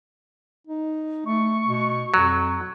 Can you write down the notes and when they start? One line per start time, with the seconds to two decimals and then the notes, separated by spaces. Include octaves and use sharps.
0.67 D#4
1.26 A3 C#6
1.66 B2
2.14 F2 F#3